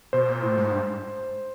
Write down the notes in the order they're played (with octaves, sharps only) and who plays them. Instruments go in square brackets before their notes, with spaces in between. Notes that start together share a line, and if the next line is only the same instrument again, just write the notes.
[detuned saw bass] B2 [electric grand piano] C5
[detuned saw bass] A#2
A2
G#2
G2